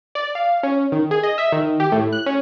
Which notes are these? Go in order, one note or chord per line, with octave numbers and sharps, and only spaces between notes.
D5
F5
C#4
D#3
G#4
D#5
E5
D#3
G4
A2
F#6
C#4